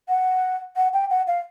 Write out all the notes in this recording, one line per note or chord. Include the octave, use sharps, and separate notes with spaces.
F#5
F#5
G5
F#5
F5